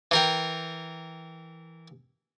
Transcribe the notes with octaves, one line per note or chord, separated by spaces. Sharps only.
E3 A#4 G5